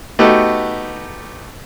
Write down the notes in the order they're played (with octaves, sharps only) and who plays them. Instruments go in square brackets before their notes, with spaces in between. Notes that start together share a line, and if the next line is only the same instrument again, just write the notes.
[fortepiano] A3 B3 D#4 F#4 G4